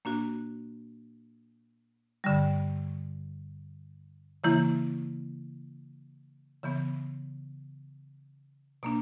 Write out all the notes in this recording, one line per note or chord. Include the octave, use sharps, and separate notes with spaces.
A#2 A#3 D4 F#4
G2 D3 G3
C#3 E3 A#3 E4
C#3 E3 B3
B2 A#3 D4